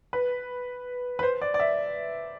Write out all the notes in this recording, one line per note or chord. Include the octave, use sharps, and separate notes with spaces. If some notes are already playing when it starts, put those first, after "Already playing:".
B4
B4
C5
D5
D5
E5